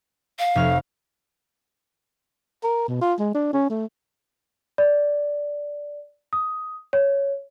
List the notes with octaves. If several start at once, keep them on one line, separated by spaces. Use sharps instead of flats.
F5
F1 C#5 F6
A#4
B2
F4
G#3
D4
C#4
A3
D5
D#6
C#5